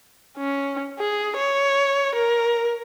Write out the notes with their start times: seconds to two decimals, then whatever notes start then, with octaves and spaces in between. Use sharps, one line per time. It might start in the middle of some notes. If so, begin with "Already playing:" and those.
0.38 C#4
0.99 G#4
1.37 C#5
2.15 A#4